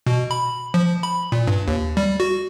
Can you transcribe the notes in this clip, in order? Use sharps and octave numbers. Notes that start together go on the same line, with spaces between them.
B2
B5
F3
B5
A#2
G2
D#2
G3
F#4